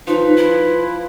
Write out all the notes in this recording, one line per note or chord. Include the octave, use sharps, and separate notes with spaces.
F3 D#4 B4
E4